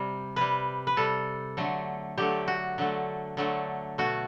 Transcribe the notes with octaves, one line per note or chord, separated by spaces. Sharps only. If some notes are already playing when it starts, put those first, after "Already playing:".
Already playing: C3 G3
C3 G3 B4
B4
C3 G3 A4
D3 F#3 A3
D3 F#3 A3 G4
F#4
D3 F#3 A3
D3 F#3 A3
B2 A3 F#4